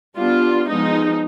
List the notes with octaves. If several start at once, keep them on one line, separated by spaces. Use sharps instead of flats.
G3 B3 D4 F4
F3 G#3 B3 D#4